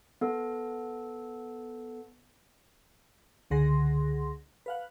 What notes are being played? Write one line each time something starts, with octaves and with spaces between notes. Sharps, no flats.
B3 A4
C#2 D3 G#4 F#5 C6 A#6
B4 F5 F#5